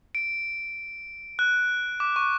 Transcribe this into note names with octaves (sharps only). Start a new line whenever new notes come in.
D7
F#6
D6
C#6